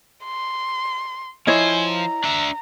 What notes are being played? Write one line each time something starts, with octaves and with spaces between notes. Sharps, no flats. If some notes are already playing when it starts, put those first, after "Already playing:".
C6
F3 E4 C5 C#5 D#5 G#5
A#5
D4 E5